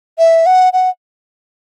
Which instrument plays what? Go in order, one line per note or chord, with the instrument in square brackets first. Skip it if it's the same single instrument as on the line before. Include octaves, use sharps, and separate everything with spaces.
[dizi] E5
F#5
F#5